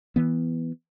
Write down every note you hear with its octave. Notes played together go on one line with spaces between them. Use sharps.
E3 B3